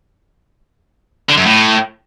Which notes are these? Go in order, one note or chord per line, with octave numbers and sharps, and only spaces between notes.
D3
F#2
A2